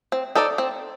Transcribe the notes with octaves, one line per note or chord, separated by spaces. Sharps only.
C4
D#4 A4 D5
C4